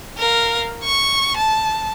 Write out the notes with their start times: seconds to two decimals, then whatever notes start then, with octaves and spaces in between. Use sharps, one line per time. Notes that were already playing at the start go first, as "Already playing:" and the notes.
0.18 A#4 F5
0.83 C#6
1.37 A5